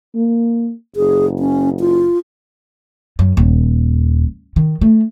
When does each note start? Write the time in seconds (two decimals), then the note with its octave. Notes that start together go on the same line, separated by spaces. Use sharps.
0.15 A#3
0.96 F#1 G#4
1.39 C#4
1.80 F4
3.19 F#2
3.37 D#1
4.56 D#3
4.81 A3